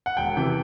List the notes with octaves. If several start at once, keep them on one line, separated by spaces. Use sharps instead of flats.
F#5
E1 G5
C3 E3 G5